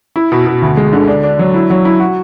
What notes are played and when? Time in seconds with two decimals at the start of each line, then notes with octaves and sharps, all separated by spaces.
0.16 E4
0.32 B2
0.46 B2
0.62 D2
0.77 G#3
0.93 D3
1.08 D4
1.24 D4
1.39 F#3
1.54 E4
1.70 F#3
1.85 E4
2.00 F#4